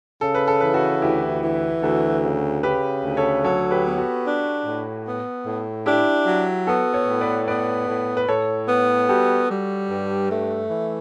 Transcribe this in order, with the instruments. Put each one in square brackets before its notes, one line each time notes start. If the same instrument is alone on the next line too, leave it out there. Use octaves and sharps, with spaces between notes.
[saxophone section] C#3 [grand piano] A4
[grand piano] B4
A4
[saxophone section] E3 [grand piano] B4
[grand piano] F#4 A4
[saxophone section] D2 [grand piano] E4 G4
[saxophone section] E3
[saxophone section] D2 [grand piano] F#4 A4
[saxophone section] C#3
[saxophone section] C#3 [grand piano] G4 B4
[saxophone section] D2
[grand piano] A4 C#5
[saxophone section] F#3 [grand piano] A4 C#5
[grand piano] G4 B4
[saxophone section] B3
[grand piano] F#4 A4
[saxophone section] D4
A2
B3
A2
[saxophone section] D4 [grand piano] E4 G4
[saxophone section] F#3
[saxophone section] B3 [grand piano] F#4 A4
[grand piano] A4 C#5
[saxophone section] A2
[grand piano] B4 D5
[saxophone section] B3 [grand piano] B4 D5
[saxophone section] A2
[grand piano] B4
[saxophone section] A2 [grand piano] A4 C#5
[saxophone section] B3
[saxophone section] G3 [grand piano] F#4 A4
[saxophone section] G3
G2
A3
E3